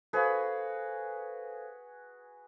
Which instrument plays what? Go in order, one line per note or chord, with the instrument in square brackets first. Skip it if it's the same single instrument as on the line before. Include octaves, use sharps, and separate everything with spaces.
[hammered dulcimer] F#4 G#4 B4 [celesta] A4 C5 F5